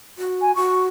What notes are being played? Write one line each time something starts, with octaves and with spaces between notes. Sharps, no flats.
F#4
G#5
F#4 C#6